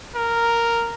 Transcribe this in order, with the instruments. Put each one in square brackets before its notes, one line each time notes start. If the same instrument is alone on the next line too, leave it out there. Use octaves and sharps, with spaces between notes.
[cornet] A#4